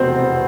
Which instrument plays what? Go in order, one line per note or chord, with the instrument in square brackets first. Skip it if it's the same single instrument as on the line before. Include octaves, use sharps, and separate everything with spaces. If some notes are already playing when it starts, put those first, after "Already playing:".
Already playing: [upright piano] F1 E2 B2 B3 C4 C5